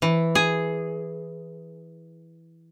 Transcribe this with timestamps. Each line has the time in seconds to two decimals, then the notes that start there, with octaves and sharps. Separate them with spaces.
0.02 E3
0.35 G#4